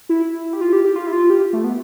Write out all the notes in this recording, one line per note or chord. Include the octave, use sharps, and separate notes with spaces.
E4
G4
F4
G4
G4
F4
E4
F4
G4
A3
B3